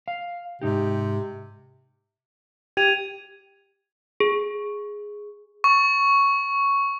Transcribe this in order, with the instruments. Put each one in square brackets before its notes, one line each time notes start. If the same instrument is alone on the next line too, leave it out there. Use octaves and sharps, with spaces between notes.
[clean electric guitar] F5
[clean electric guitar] G#2 D#4 G4 [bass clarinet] C3
[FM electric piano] G4 [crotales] G#6 D#7 F7
[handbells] G#4
[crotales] C#6